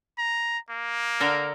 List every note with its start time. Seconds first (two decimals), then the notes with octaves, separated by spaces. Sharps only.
0.18 A#5
0.70 A#3
1.20 D3 A4 A#4